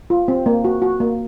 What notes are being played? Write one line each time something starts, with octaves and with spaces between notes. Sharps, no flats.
F4
C4
A#3
F#4
F#4
A#3